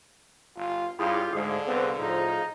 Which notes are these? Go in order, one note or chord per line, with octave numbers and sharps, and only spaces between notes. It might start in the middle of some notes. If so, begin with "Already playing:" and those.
G1 F4
G2 C#3 E4 F4 G4 G#4
D2 G#2 D3 G#4 F5
C2 B3 C4
A2 F3 D#4